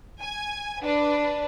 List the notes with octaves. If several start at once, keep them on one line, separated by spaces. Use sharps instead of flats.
G#5
D4 B4